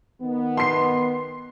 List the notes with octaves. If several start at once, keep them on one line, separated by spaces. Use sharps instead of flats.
D#3 B3
C6 C7